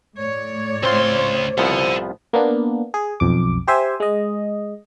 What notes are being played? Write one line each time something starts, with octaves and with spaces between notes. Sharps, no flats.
A2 C#5 D5
C#2 C4 F4 C5 C6
C2 F3 B3 A4 F#5
A#3 B3 D4
G#4
B1 F2 D6
G4 C5 E5 G#5
G#3 D#5